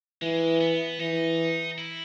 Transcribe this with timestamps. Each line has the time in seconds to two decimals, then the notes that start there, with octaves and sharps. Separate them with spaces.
0.22 E3 G#3
0.61 B3
0.99 E3 D#4
1.78 E4